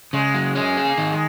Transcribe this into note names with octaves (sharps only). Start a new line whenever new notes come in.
C#3 G#3
F#3
G#3 C#4
G#4
A#3
D#3
G#3